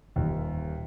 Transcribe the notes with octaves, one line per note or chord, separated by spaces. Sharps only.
D#1 D#2